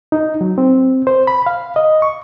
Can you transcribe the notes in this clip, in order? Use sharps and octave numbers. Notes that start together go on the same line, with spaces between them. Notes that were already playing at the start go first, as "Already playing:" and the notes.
D#4
F#3
C4
C5
B5
F5
D#5
C#6